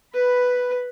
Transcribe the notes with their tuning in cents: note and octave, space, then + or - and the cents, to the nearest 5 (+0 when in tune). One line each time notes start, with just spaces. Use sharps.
B4 +0 B5 +0